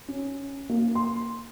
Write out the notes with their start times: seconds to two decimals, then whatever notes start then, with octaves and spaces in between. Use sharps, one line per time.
0.08 C#4
0.69 A#3
0.95 C6